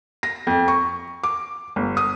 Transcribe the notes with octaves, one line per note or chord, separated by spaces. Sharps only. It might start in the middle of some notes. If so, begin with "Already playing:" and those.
A#6
F2
C#6
D6
G1
D#6